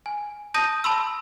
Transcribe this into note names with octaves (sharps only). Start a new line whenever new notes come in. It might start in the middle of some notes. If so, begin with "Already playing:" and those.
G#5
A5 D#6 G6 A#6 D#7
A5 B5 C6 E6